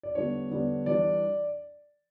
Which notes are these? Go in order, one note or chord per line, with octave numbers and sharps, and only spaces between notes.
D5
D3 G3 B3 D4 C#5
D3 G3 B3 D4
E3 G3 D4 D5